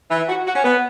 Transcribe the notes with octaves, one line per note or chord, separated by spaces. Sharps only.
E3
F#4
F#4
C#4
B3